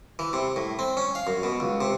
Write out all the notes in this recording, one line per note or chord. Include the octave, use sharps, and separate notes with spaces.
E3
C3
A2
C4
C#4
F5
F#2
B2
C#2
C3